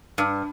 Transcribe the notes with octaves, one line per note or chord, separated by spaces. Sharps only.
G2